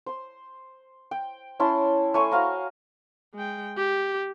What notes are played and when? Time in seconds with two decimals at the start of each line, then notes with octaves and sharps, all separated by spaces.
0.06 C5 C6
1.11 G5
1.60 C#4 E4 A5 C6
2.14 A3 C#5 G#5 C6
2.31 F#4 C5 F5 A#5
3.34 G#3 G5
3.77 G4